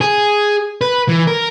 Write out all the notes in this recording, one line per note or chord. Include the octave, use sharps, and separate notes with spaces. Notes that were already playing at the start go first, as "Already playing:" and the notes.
G#4
B4
E3
A#4